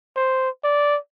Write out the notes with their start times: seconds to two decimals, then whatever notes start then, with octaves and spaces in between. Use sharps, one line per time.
0.16 C5
0.64 D5